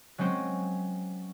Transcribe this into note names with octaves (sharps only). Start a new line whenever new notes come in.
F#3 G#3 C4 C#4 C5